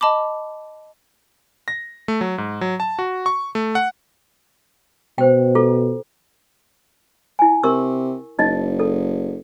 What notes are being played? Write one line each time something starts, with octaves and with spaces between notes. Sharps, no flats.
D#5 A5 B5 D6
A#6
A3
F#3
G#2
F#3
A5
F#4
C#6
A3
F#5
B2 C5 G5
F4 A4
E4 G#5
C3 A#4 C#6 E6
F#1 D#4 D#5
A4